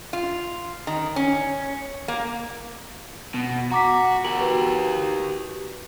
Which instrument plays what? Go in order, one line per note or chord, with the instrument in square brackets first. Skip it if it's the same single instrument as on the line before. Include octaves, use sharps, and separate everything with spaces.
[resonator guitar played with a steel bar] F4
D#3
C#4
A#3
[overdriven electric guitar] B2
[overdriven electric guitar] F#4 [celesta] A#5 D6 B6
[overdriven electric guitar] G4 A#4 [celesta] F#7
[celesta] F#4 B4